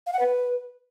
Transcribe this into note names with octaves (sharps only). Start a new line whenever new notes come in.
F5
F#5
B4